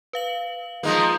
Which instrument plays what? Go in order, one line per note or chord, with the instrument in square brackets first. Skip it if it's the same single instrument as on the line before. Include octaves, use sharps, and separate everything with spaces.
[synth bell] B4 F5 F#7
[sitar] F3 G#3 A#3 [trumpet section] D#4